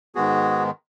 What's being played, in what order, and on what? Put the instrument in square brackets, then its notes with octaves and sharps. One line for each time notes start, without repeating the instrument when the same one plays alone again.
[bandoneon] G#2 D#3 G#3 B3 F#4 G#4